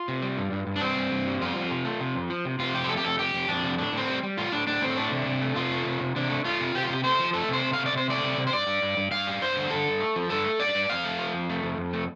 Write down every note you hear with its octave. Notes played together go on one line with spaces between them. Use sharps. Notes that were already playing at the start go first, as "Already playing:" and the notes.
Already playing: F4
C3
G3
G2
G2
G2
D4
G3 C4
G2
G2
G3
F2 F4
F2
C3
A3
C3
F2
F3
C3
C3 F4
F2 G4
C5
A3 A4
G4
F2 A4
F2 G4
F2
F2 D4
C3
A2 D4
A2 C4
G3
G3
A2 F4
A2 D4
A2 D4
A2 C4
A3 D4
C3
C3
A3
C3 F4
A3
C3
C3
C3 D4
A3
A3 F4
C3
C3 G4
F4
C3 G4
A3 C5
F3
A3 A4
C3 C5
A3
F5
C3
D5
C3 C5
A3 D5
C3
C3
C5
G2 D5
G2
G2
G2
G2 F5
G3
G2 C5
D3
G2 A4
G2
A3
F3
G2 A4
A3
G2 D5
G2
F2 F5
A3
F3
F2
A3
F2
F2
A3